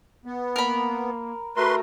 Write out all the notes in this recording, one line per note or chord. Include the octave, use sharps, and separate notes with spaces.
B3
A#3 A#4 B5
A3 F#4 A#4 B4 C6